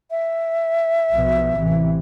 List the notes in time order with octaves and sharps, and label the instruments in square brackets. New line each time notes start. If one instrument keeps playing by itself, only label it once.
[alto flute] E5
[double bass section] B1 B2 F3
A1 C3 E3